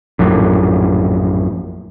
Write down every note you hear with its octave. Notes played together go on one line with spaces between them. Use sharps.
A#1 F#2 A2